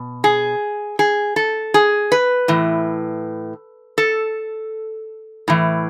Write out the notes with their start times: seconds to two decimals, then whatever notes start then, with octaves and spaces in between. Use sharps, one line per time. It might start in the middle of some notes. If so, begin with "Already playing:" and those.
Already playing: B2
0.24 G#4
0.99 G#4
1.36 A4
1.74 G#4
2.12 B4
2.48 A2 E3
3.98 A4
5.48 A2 E3